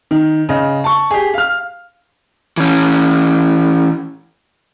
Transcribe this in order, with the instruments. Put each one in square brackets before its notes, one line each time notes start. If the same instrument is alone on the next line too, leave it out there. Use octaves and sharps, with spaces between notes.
[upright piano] D#3
C#3 D#5
A5 C#6
G4 G#4
F5 F6
[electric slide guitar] E3 C#4